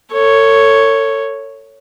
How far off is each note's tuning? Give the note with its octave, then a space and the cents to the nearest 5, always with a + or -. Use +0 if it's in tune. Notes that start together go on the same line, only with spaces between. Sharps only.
A4 +40 C#5 +0